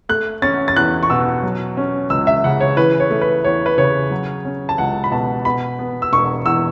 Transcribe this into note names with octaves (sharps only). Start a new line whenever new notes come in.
A3 F#6
C#4 A6
A6
E2 F#6
C#6
B2 E6
F#3
C#4
C#2 E6
E5
C#3 F#5
C#5
E3 B4
C#5
A3
B4
E2 C#5
B4
C#3 C#5
F#3
C#4
A5
C#2 F#5
B5
B2 A5
B2 B5
B3
E6
E1 C#6
E2 E6